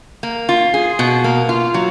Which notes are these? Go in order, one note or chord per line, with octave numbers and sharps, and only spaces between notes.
A#3
F4
G#4
B2
A#3
F4
F#3